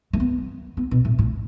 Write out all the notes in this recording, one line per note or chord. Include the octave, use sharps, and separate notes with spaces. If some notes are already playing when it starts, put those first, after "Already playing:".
A3
B3
B3
B2
A2
A2